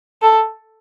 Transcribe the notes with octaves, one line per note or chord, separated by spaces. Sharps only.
A4